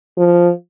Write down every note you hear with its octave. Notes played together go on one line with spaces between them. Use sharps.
F3